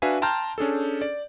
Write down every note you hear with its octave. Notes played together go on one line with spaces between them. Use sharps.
D4 F#4 B4 E5 F5 G#5
G5 A5 A#5 C6 F6 G6
C#4 D4 G#4 A4
D5